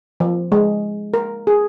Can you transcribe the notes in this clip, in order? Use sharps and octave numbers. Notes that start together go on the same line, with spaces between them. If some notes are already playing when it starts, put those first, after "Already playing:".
F3
G#3
A#4
G#4